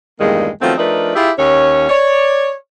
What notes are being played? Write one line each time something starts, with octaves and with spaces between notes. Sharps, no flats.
E2 G2 A#2 D#3 G#3 A#3
D#3 F3 F#3 A3 B3 C4
F3 A3 D4 D#4 A#4 B4
E4 F4 G4 G#4 E5
D#2 C#4 C#5
C#5 D5